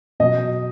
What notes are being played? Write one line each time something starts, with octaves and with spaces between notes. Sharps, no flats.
B2 F#3 D#5